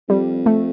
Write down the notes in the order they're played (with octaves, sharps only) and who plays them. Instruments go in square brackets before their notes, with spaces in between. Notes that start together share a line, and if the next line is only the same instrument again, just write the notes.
[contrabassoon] F2 [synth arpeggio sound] G3
[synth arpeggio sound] A3